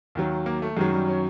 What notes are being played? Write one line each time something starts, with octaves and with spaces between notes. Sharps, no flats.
D#2 D#3 F#3
A#3
A3
F#2 D#3 F#3 G#3
G3
C#4